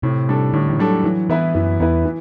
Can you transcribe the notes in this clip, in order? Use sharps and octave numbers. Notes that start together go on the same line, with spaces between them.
A2 C3
G3 D4 A4
A2 D3
E3
F#3 G3 D4 A4
E3 F#3
E3 B3 E4 B4
F#2 E3
E2 B3 E4 B4
E3